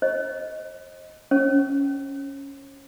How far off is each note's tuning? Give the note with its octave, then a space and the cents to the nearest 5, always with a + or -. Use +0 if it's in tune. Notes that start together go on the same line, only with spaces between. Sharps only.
C5 +40 D#5 +5
C#4 +0 C#5 -45